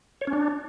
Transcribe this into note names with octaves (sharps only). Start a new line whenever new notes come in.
C#5
C#4
D4